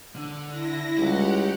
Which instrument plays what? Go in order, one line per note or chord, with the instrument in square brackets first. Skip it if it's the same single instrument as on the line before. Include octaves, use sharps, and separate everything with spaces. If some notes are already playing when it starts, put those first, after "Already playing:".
[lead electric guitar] D3
[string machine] E4 A#6
[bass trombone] C#2 [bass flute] G3 [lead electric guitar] G4 [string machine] F#5